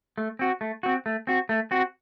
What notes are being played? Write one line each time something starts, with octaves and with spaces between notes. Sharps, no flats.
A3
C4 F#4
A3
C4 F#4
A3
C4 F#4
A3
C4 F#4